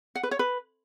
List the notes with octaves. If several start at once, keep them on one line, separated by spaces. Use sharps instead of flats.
F#5
B4
C#5
B4